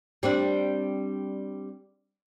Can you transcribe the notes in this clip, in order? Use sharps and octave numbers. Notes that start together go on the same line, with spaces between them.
G3 C4 D4